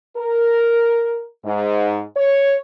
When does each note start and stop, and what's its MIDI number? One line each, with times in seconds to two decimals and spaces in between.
0.17 1.23 70
1.45 2.00 44
2.16 2.56 73